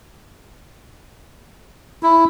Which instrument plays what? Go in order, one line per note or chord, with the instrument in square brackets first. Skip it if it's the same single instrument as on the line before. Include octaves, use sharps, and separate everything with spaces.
[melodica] E4